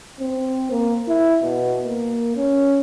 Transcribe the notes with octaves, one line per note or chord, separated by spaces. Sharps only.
C4
A#3
E4
B2
A#3
C#4